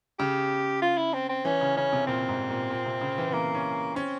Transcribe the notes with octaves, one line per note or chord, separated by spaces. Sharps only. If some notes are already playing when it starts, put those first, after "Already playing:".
C#3 G4
F4
E4
C4
C4
E3 C#4
C#3
C#3 C#4
C3
A#2 C4
G#2
A#2
A#2
C3
C#3
E3
E3 A#3
C#4
C4 C#4